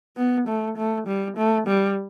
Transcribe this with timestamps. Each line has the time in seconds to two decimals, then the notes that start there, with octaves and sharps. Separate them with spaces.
0.17 B3
0.47 A3
0.77 A3
1.07 G3
1.37 A3
1.67 G3